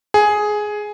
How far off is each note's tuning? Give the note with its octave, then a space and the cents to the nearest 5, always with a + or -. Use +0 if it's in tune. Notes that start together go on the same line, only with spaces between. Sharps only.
G#4 +10